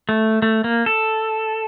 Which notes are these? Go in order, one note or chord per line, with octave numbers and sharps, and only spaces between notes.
A3
A3
A#3
A4